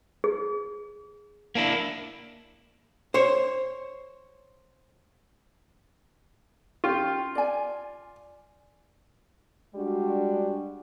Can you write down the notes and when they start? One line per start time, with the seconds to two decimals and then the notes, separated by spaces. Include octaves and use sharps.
0.24 G#4
1.55 A#3 D4 E4
3.14 C5 C#5
6.84 C#4 F4 G4
7.35 D5 G#5
9.74 G3 G#3 D4 F#4